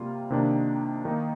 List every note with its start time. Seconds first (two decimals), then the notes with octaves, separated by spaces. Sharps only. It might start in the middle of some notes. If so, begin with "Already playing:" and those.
Already playing: C3 G3 A#3 F4
0.30 C3 D#3 A#3 D4
1.05 D#3 A#3 D#4